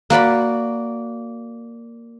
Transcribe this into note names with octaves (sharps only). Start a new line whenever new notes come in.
A#3 F#4 D5 B5